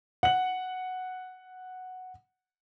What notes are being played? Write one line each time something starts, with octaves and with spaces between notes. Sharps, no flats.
F#5 F#7